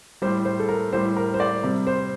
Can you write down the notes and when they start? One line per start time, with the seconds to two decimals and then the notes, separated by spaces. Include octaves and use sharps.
0.22 G3 C5
0.25 A2
0.45 C5
0.59 A4
0.69 A#4
0.93 A2 G3 C5
1.17 A#4
1.34 C5
1.40 D5
1.63 C3 G3
1.87 C5